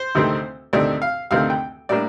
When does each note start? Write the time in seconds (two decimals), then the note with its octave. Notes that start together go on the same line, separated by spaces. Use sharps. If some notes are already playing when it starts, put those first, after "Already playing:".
Already playing: C5
0.15 D2 C3 D#3 A3 C4
0.73 D2 C3 D#3 A3 C4 D5
1.02 F5
1.31 D2 C3 D#3 A3 C4 F5
1.50 G5
1.89 A2 G3 A#3 D4 D5